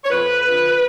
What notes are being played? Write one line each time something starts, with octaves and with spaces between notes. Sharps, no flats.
C#5
F2 B4
D3 F3